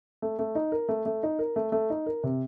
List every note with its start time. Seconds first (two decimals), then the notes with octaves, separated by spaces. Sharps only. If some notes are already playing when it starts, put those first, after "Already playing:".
0.22 A3
0.39 A3
0.55 D#4
0.72 A#4
0.89 A3
1.06 A3
1.23 D#4
1.39 A#4
1.56 A3
1.72 A3
1.90 D#4
2.06 A#4
2.23 C3